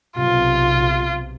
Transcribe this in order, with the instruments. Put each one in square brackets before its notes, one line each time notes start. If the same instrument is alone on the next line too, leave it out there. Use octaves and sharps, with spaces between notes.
[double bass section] B1 C3 [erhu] F4